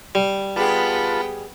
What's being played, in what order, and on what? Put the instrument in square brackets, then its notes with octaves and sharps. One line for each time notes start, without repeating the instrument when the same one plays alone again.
[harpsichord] G3
[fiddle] B3 G5 [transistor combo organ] F4 B4 A5 [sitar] G4 G#4